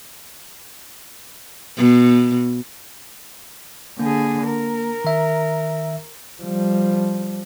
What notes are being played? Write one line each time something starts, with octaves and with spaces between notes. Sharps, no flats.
B2
D3 A#3 G#4
A#4
D#3 E5
F3 G3